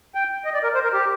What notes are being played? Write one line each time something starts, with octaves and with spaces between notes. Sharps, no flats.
G5
D#5
D5
A#4
C5
A#4
G4